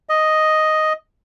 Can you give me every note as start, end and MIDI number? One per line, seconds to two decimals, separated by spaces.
0.09 0.93 75